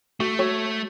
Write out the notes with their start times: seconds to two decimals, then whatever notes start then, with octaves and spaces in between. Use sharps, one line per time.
0.20 A3 F#4
0.39 F#4 C#5